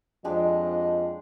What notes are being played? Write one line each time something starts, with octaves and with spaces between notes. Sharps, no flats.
F2 F3 G#3 D4 G4 D#5